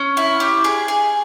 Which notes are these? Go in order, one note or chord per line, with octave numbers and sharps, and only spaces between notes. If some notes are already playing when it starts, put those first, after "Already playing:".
Already playing: C#4
E4
G4
G#4
G#4